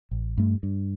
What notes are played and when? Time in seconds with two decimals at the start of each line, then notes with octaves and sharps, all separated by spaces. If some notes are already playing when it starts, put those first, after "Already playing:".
0.11 A1
0.37 G2 A3
0.63 G2